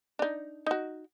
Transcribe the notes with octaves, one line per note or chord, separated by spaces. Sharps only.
D4 D#4
D#4 F#4